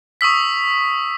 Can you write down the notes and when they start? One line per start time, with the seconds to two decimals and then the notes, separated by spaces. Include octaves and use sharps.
0.21 C#6 D#6 E6 B6